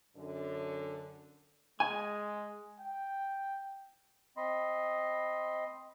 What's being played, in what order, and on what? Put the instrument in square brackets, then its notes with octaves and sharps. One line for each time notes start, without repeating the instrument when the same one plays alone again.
[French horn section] F#2 D3
[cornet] G#3 [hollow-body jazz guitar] G#5
[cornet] G5
[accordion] C4 D#5 B5 C6